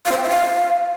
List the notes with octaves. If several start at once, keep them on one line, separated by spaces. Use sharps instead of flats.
F5
C5
G5
E5
F5